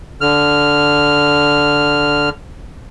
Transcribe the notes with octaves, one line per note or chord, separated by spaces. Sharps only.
D3 F6